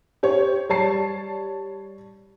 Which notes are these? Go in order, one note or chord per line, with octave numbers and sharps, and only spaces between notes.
G4 C5 C#5
G3 C#5 A5 C7